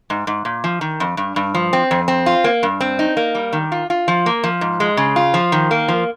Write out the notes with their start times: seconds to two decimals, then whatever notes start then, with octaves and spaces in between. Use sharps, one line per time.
0.10 G#2
0.27 G#2
0.45 A#2
0.64 F3
0.81 D#3
1.00 F2
1.17 G2
1.36 G2
1.54 F3
1.73 C4
1.91 F2
2.08 C4
2.26 F4
2.44 A#3
2.63 G2
2.81 C4
2.99 D#4
3.17 A#3
3.35 G3
3.53 D#3
3.72 F4
3.90 F4
4.08 F3
4.26 A#3
4.44 F3
4.61 G#2
4.80 G#3
4.97 C#3
5.16 F4
5.34 F3
5.52 D#3
5.71 A#3
5.88 F3